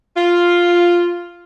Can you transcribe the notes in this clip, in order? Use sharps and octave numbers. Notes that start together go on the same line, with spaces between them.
F4